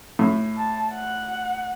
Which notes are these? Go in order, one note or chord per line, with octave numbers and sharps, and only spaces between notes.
A2
A5
F#5